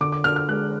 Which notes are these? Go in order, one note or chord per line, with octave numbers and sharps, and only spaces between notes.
D3 D6
D6
D3 F6
F6
G#3 F#6